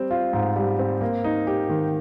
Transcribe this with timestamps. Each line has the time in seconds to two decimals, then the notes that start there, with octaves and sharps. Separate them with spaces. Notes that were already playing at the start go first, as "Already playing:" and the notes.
Already playing: G3 C4
0.11 F4
0.33 G#2
0.56 G3
0.79 C4
1.01 A#3
1.24 D#4
1.47 G4
1.69 D#3